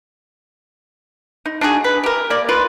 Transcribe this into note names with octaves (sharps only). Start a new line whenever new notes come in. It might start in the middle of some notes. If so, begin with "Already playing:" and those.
D#4
D4 D#4 F#4 G#4
B4
G4 A#4
A#3 D5
F4 A#4 B4